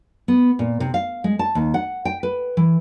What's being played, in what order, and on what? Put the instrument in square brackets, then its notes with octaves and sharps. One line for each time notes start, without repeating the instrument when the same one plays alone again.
[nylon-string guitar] B3
A#2
C3
F5
G#3
A5
D#2
F#5
G5
B4
E3